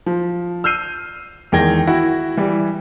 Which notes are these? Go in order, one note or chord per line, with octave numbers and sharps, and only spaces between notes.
F3
E6 F6 G6 C7 D#7
E2 D#3 G#3 G5 G#6 A#6
E4 F#4 F#5
E3 G3 G4